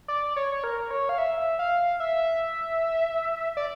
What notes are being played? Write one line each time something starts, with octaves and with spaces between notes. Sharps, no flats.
D5
C#5
A#4
C#5
F5
E5
F5
E5
D5